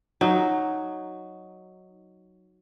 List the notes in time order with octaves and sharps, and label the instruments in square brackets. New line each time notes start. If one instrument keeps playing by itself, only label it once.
[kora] F#3 D#4